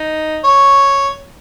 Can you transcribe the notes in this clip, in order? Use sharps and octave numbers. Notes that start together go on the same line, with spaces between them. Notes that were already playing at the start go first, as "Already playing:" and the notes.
Already playing: D#4
C#5